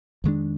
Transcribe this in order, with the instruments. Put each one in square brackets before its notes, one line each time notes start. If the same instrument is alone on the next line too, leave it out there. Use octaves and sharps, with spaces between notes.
[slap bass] F2 D#3 G#3 D4